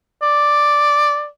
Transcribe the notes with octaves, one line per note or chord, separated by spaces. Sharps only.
D5